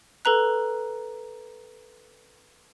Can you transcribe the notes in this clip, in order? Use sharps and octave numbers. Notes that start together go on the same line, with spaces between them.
A4 B4 A#5 F#6